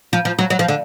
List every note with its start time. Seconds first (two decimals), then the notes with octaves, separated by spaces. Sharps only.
0.13 F3
0.25 F3
0.39 F#3
0.50 F#3
0.59 F3
0.68 D3